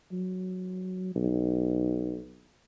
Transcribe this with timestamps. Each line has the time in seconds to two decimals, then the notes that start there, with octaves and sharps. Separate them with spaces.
0.12 F#3
1.16 B1